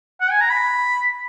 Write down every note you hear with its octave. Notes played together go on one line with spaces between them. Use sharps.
F#5
G#5
A#5
B5